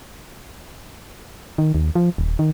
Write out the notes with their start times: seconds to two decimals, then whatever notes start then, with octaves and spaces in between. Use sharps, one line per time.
1.58 D#3
1.75 D#2
1.95 F3
2.18 D#1
2.39 D#3